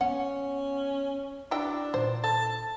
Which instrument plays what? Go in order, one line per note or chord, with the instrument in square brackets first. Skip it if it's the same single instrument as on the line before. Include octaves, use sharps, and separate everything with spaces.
[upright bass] B3 [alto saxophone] C#4 [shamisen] F#5
[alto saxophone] D4 [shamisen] E4 F#4 G5
[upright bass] A#2 [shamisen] C5
[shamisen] A4 [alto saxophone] A5